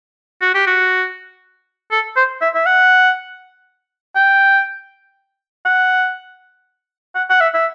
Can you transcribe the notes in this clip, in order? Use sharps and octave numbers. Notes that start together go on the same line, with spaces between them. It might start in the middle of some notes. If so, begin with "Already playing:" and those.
F#4
G4
F#4
A4
C5
E5
E5
F#5
G5
F#5
F#5
F#5
E5
E5